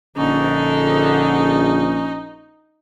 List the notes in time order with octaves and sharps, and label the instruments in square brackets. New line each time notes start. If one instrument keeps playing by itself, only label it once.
[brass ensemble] A#1 [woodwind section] D3 [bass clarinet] C#4 [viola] D#4